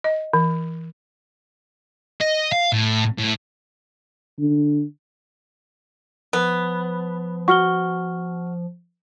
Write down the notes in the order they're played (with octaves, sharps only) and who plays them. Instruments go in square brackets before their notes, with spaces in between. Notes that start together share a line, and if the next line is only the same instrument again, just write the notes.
[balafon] D#5
E3
[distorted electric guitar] D#5
F5
A2
A2
[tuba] D3
[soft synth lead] F3 [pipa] B3
[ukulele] F#4 [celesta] C#6 F6 G7